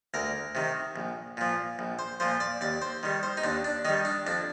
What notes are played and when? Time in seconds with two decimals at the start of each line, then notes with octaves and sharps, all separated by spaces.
0.14 D2 A#4
0.55 C3 D#3
0.96 A#1
1.37 A#2 F3
1.79 A#1
1.99 C5
2.20 A#2 F3 C5
2.40 D5
2.61 D#2 D5
2.82 C5
3.03 D#3 G3
3.23 C5
3.37 D#4
3.44 D#2 D4
3.65 D4
3.85 D#3 G3 D#4
4.05 D4
4.27 F2 D4